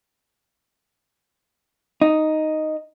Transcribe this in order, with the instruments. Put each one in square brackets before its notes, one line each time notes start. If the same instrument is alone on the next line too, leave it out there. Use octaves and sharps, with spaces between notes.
[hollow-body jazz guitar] D#4